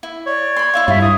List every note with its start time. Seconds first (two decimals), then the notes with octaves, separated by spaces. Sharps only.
0.03 E4
0.26 C#5 D5
0.56 B5 C6
0.74 E4 E5 F5
0.88 G2 E4 F4
1.02 D#6